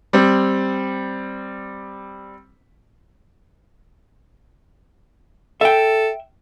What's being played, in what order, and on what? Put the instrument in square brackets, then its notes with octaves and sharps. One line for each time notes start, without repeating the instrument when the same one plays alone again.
[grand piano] G3 C4
[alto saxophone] A4 [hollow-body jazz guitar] E5 G5